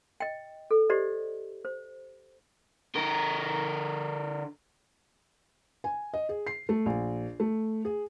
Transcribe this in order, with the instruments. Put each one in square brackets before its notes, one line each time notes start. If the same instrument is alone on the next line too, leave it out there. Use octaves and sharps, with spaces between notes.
[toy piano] D#5 G5
A4
G4 C5 D5 D#5
C5
[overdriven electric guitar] D3 A#4
[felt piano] G#5
D#5
G#4
C7
A3
A#1
A3
G#4